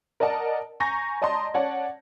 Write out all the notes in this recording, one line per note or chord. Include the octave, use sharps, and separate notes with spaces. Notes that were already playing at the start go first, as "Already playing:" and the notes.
A#4 D5 D#5 F#5 A5
G#5 A#5 C#6 G6 A#6
D5 D#5 A5 A#5 C6
C#4 C#5 D5 F#5 A5